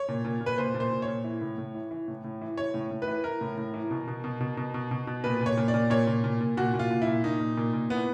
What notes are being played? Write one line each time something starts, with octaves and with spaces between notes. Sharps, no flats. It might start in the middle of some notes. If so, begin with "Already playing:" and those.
Already playing: C#5
A#2
A#2
A#2
B4
A#2 C5
A#2
C5
A#2
C#5
A#2
E3
A2
A2
E3
E3
A2
A2
E3
E3 C#5
A2
A2
B4
E3
E3 A#4
A2
A2
E3
B2
B2
B2
B2
B2
B2
B2
B2
A#2 B4
A#2
C#5
A#2
D5
A#2
A#2 C#5
A#2
A#2
A#2
A#2 F#4
A#2
F4
A#2
E4
A#2
A#2 D#4
A#2
A#2
A#2
E3 B3